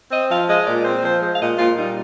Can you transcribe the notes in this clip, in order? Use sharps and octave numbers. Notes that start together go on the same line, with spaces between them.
C4 D#5
F3 F5
G#3 D#5
A#2 D5
C4 C5
F3 C5
G#3
F5
A#2 D#5
A#2 F4
G3 D#4